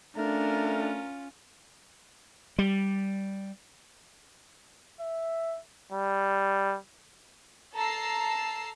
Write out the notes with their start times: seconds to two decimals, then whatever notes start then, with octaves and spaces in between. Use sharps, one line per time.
0.17 A3 C#4 D4 F4 A#4
2.59 G3
5.00 E5
5.92 G3
7.75 A4 A5 A#5 E6 C7